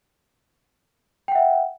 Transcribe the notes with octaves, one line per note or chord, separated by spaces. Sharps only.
E5 F#5 G5